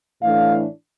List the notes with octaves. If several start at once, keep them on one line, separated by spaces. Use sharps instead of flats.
A2 E3 A3 D4 F5